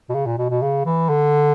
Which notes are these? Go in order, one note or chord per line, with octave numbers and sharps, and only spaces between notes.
B2
C#3
A#2
B2
B2
C#3
E3
D3